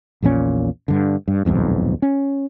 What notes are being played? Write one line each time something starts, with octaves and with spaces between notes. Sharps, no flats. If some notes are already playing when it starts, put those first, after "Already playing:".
A#1 E2 A#2 C#4
G2 D3
G2
D#1 B1 F2 G#2
C#4